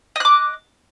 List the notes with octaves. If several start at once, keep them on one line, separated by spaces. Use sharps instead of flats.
D#5 D6 F#6